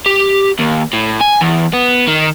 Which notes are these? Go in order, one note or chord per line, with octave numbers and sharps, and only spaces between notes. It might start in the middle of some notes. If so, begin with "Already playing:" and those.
G4
D#2
A2
G#5
E2
B3
D#3